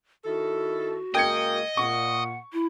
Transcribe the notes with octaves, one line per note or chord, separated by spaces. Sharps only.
D#3 E4 F#4 A4
C#3 G#3 A#3 D#5 G5 G#6 C#7
A#2 F#5 C#6
E4